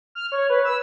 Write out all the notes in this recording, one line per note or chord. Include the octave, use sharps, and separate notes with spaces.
F6
C#5
B4
E6